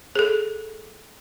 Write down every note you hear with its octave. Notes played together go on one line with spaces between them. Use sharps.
G#4 A4